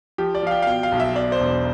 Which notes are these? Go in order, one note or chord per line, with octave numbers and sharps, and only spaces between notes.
F3 G4
D5
F3 F5
G5
F5
B2 G5
F5
B1
E5
B2 D5
C5
E1